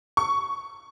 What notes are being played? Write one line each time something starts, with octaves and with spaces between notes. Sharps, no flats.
C#6